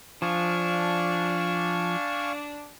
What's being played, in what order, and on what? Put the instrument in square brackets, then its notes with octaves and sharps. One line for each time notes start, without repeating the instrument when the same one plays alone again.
[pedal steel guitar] F3 [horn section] D4 [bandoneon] F5 G#5 C#6